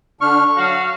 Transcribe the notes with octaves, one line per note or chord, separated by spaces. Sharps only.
D3 D4 C#6 F6
F#3 F#4 F5